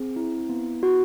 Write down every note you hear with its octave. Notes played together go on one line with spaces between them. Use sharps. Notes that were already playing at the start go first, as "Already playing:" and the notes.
Already playing: C4 G#4
E4
B3
F#4